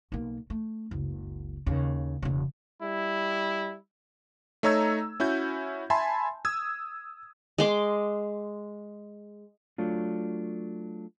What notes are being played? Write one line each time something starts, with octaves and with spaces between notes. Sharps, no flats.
B1 A#3
A3
F#1 C#2
D#2 C#3
E1 C#3
G3 E4
A3 D#4 C#5 A#5 E6 G#6
C#4 E4 F#4 G6
E5 G#5 A5 B5 C6
D#6 E6 G#6
G#3 C6 D6
F#3 A3 D4 F4